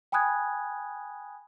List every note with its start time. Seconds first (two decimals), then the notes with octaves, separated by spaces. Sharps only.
0.12 G5 G#5 B5 D#6 F#6 G#6